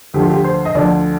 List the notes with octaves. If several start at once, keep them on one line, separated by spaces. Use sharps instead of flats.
D2 D3 F3 G4
F4
G4
C5
D#5
D2 D3 F3 D5